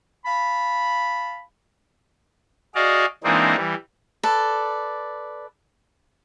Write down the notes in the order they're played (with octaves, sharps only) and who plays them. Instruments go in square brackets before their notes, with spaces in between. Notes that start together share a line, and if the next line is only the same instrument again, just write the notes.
[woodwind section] F5 A5 B5
[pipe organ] F#4 G#4 D5 D#5 F5
E3 G#3 A#3 C4 D4 D#4
E3 G3
[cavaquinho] A4 B4 D5